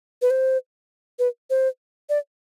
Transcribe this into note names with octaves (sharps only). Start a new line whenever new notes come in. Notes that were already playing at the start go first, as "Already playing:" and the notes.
B4
C5
B4
C5
D5